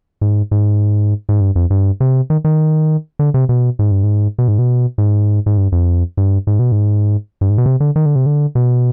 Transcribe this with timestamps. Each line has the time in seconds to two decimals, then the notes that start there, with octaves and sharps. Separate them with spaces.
0.21 G#2
0.51 G#2
1.29 G#2
1.41 G2
1.56 F2
1.70 G2
2.00 C3
2.30 D#3
2.45 D#3
3.19 D3
3.34 C3
3.49 B2
3.79 G#2
3.91 G2
4.03 G#2
4.38 B2
4.48 G#2
4.59 B2
4.98 G#2
5.46 G#2
5.57 G2
5.72 F2
6.17 G2
6.47 G#2
6.59 B2
6.72 G#2
7.41 G2
7.50 G#2
7.58 B2
7.66 C3
7.80 D3
7.96 D#3
8.06 D3
8.15 C3
8.26 D3
8.55 B2